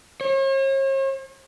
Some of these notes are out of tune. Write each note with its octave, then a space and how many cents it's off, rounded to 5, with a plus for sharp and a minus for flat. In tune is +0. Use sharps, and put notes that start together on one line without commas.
C#5 -45